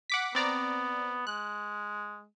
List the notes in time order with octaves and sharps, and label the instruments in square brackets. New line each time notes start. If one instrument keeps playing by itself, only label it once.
[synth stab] F#5 D6 B6
[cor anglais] B3 [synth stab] C4 D5 A#5
[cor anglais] G#3 [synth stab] F#6